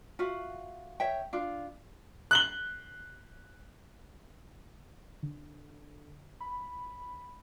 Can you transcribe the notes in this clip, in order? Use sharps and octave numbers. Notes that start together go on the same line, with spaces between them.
F4 F#4 E5 F#5
C#5 E5 G5
D4 F4
F#6 F#7 G7
D3
B5